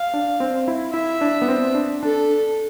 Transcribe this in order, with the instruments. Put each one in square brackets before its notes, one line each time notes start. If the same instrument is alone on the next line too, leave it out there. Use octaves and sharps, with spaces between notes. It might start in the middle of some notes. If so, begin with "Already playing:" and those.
Already playing: [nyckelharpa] F5
[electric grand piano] D4
C4
E4
[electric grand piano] E4 [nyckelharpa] E5
[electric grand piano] D4
B3
C4
D4
[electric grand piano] D4 [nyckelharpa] A4